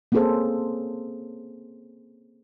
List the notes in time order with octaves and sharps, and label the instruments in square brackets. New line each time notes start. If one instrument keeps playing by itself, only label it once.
[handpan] A#3 C4 C#4 G#4 A4 C5